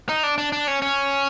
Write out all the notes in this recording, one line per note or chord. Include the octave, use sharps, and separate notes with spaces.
D#4
D4
D4
D4
C#4
C#4